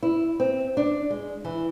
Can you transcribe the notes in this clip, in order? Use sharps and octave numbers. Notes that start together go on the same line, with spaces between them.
E4
C4
D4
G#3
E3